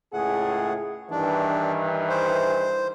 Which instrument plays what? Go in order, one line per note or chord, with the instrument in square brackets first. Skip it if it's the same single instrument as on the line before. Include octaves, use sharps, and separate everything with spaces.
[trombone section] C#2 A2 G#4 [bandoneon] F#5
[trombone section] G2 D#3 E3 [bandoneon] D4
[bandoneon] C5